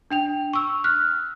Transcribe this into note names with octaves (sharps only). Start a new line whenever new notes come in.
D4 G5 F7
C#6 E6
F6 F#6